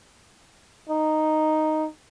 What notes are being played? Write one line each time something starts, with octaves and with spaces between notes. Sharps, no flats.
D#4